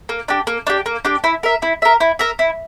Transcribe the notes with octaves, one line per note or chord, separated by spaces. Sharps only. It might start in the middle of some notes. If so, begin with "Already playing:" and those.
A#3
D4 G4
A#3
D4 G4
A#3
D4 G4
E4
A#4 E5
E4
A#4 E5
E4
A#4 E5
E4